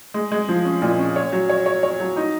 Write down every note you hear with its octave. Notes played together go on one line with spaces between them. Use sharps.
G#3
G#3
F3
C#4
A#2
C#4
C#5
F#3
C#5
C#5
C#5
F#3
D#4